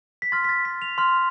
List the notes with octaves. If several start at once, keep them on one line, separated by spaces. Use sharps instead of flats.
B6
C6 F6 A6
B6
A6
B6
F7
C6 F6